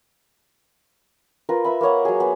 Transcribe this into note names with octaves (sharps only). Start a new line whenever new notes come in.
F4 A#4 B4
B4 E5 B5
A#3 A#4 C#5 F#5
F#3 G#4
B3